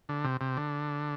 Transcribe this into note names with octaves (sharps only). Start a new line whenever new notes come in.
D3
C3
C3
D3